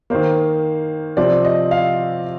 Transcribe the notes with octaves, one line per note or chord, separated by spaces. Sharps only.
D#3 A#3 C5
C3 F3 C4 D5
D#5
F5